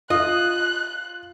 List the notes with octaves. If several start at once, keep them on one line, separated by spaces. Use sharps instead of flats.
F4 D#5 F#6